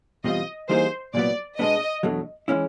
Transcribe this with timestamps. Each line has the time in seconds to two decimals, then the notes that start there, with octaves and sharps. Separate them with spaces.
0.24 E2 B2 G3 C4 F4 D#5
0.68 E3 G3 A#3 D#4 G#4 C5
1.14 C2 A#2 F#3 B3 D5
1.59 B2 G#3 B3 D4 D#5
2.03 E2 B2 F#3 A3 D4
2.48 E3 G#3 C#4 E4